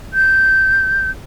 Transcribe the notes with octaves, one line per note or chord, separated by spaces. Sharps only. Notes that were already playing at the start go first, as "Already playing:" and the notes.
G6